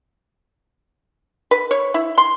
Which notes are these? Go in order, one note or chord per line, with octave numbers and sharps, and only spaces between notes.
B4
C#5
E4
C6